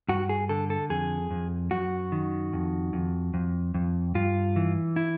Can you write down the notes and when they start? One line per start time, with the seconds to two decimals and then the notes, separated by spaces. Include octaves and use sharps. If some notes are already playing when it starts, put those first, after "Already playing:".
0.09 G2 F#4
0.29 G#4
0.49 D3 A4
0.70 A4
0.90 F2 G#4
1.31 F2
1.71 F#2 F#4
2.12 D#3
2.53 F2
2.93 F2
3.34 F2
3.75 F2
4.15 G2 F4
4.56 E3
4.96 E4